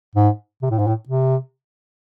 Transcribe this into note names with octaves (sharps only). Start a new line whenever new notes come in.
G#2
C3
A2
G#2
A2
C3